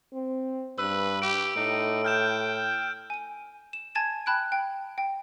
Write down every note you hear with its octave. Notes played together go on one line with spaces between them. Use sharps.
C4
G2 B4 E6
G4 D7
A2 D#4 D7
G5 F6 G6 E7
G#5 D#7
E7
G#5 A5 G#6 A6 D#7 E7
G5 A5 B5 F#6 G#6 D7
G5
G5